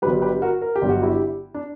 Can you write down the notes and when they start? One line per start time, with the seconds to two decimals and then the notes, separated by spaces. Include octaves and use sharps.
0.02 G1 G2 F#3 G4 B4
0.22 G4 B4
0.42 F#4 A#4
0.62 A#4
0.76 G4
0.82 G1 G2 F#3
0.89 F#4
1.03 E4 G4
1.54 D4